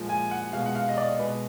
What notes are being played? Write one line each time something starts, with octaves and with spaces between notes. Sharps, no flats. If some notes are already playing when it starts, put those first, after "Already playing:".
Already playing: A#2 F3 G#3
G#5
F#5
B2 G#3 F5
F#5
F5
D#5
D5
B2 G#3 B4